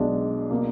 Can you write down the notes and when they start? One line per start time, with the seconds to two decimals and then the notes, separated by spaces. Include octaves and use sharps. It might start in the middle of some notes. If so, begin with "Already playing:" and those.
Already playing: B1 B2 G#3 D4
0.50 B2 A#3 D4